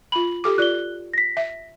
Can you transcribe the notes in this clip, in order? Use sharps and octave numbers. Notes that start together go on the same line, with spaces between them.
F4 B5 F#7
G4 A4 D6
F4 D5 F#6 G7
A#6 B6
E5